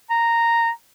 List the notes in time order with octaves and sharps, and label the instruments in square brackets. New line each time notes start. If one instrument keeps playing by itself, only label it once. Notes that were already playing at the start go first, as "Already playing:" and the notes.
[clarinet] A#5